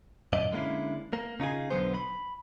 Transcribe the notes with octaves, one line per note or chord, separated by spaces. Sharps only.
F#2 A#2 D5 D#5
D3 G#3 A#3 C#4 D4 E4
A#3
C#3 D#4 F4 G#4
B1 G#2 D3 F#3 B3 C5
B5